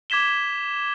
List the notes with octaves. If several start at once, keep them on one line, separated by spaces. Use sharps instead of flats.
D6 G#6 B6 E7 G7